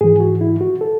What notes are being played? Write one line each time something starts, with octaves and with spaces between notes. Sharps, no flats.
G#2 E3 G#4
F#4
E4
F#4
A4